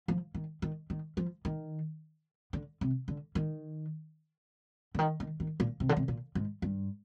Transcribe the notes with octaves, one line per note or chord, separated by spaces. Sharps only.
F3
D#3
D#3
D#3
F3
D#3
D3
C3
D3
D#3
D3
D#3
D#3
D#3
A#2
C3
D3
C3
A#2
G#2
G2